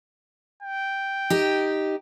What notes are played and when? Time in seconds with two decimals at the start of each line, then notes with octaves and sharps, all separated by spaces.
0.63 G5
1.30 D#4 G4